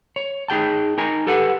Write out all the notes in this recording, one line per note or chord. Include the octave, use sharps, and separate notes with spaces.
C#5
D#4 G#4 G5 A5
D#4 A#4 G#5 A#5
G4 A4 B4 F#5